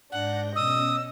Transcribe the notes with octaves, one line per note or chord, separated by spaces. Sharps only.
G#2 D4 F#5 G6 A#6
B2 C#4 D#5 D#6 E6